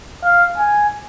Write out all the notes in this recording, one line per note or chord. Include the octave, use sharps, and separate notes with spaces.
F5
G#5